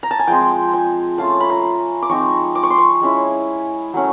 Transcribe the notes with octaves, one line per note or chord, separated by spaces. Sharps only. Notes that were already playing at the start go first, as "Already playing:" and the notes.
A#5
A5
G#5
F3 G#3 C4 G5
G#5
A3 C#4 F4 A5
B5
A#5
D6
F3 G#3 C4 D#4 C#6
D6
C#6
C6
C#6
G#3 C#4 E4
F#3 A3 C#4